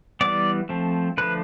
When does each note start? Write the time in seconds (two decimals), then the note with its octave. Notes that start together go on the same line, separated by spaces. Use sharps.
0.21 E3 G3 B3 D5
0.69 F3 A3 C4
1.18 D3 F3 A3 B4